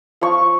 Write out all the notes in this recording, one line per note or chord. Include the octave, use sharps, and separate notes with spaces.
F3 C#6